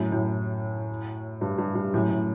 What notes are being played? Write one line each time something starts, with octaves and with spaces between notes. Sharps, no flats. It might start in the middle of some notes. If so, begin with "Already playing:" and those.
Already playing: F#2 A2
F#2 A2
G2
G2
G2
F#2 A2
A2